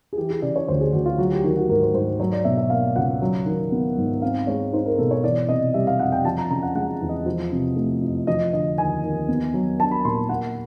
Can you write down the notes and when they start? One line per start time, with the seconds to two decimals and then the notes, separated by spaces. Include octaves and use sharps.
0.13 G#4
0.18 E3 G4
0.30 G#4
0.42 C#3 D5
0.56 C#5
0.68 D2 C5
0.80 G#4
0.93 D2 F#4
1.06 F4
1.18 F#3 F#4
1.32 G4
1.44 D#3 F#4
1.57 F#4
1.69 G#2 A#4
1.83 C5
1.94 G#2 C5
2.20 F#3 C#5
2.32 D5
2.45 B2 E5
2.57 E5
2.70 A#3 F5
2.96 C#2 F#5
3.22 F#3
3.46 D#3
3.72 B3
3.97 G#2
4.22 C4 F5
4.47 G#3 C#5
4.73 D#4 C5
4.86 A#4
4.98 B2 A4
5.11 C#5
5.24 E3 D5
5.49 C3 D#5
5.74 G3 E5
5.87 F5
5.99 F2 F#5
6.12 G5
6.25 F3 A5
6.38 A#5
6.51 C#3 A#5
6.63 F#5
6.75 G#3 F#5
7.01 E2
7.09 D#5
7.26 F3
7.52 C3
7.76 A3
8.02 F2
8.27 F3 D#5
8.53 D3 D#5
8.78 D#2 G#5
9.03 D#2
9.28 B3
9.54 F#3
9.80 D4 A5
9.91 B5
10.05 A#2 C6
10.29 A#3 F#5